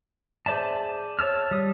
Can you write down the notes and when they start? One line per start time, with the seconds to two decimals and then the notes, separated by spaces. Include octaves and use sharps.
0.46 G#4 C5 D5 E5 A5
1.19 C#5 A5 E6 F6
1.51 G3 D#6